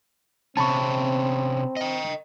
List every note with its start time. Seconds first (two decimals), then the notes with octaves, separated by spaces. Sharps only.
0.57 C3 C4 C#4 A5 B5 C#6
1.77 D#5 G5